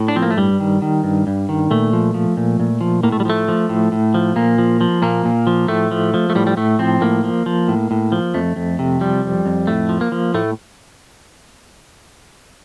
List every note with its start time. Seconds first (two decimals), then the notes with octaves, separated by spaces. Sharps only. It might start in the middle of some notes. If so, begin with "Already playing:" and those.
Already playing: A2
0.08 D4
0.16 F3 C4
0.22 A#3
0.31 A3
0.37 G2 G3
0.60 D#3
0.82 D#3
1.04 G2
1.27 G2
1.49 D#3
1.71 A#2 A3
1.93 F3
2.14 F3
2.37 A#2
2.60 A#2
2.81 F3
3.03 A2 A#3
3.12 A3
3.20 G3
3.25 F3 A3
3.48 F3
3.69 A2
3.92 A2
4.14 F3
4.36 A#2 A#3
4.58 F3
4.81 F3
5.02 A#2 A#3
5.25 A#2
5.47 F3
5.68 A2 A3
5.91 F3
6.14 F3
6.30 A3
6.35 A2 G3
6.47 G3
6.57 A2 A3
6.79 F3 C4
7.01 A2 A#3
7.24 F3
7.46 F3
7.68 A2
7.91 A2
8.12 F3
8.34 F2 A3
8.56 F2
8.79 C3
9.01 F3 G3
9.24 F2
9.46 F2
9.67 A2 A3
9.89 F3
10.01 A#3
10.12 F3
10.34 A2 A3